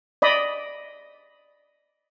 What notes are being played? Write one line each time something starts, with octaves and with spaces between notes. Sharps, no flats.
D5 D#5 B5